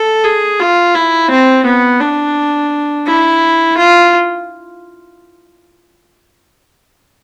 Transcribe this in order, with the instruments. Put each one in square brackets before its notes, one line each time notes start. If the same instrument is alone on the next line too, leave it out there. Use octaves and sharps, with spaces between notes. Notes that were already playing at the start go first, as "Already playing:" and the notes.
Already playing: [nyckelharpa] A4
G#4
F4
E4
C4
B3
D4
E4
F4